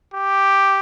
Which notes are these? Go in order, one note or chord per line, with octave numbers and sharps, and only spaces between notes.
G4